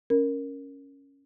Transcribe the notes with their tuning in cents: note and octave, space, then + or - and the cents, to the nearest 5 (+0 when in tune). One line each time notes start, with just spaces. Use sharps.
C#4 +0 A#4 +0